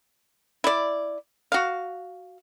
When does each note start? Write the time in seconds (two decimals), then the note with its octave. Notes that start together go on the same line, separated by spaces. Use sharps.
0.64 E4 D5
1.52 F#4 F5